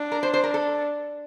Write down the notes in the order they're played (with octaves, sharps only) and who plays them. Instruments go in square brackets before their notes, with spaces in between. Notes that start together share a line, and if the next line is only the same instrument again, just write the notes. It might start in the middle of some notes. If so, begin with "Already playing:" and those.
Already playing: [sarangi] D4
[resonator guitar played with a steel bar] A#4
C5
C5
A#4
A4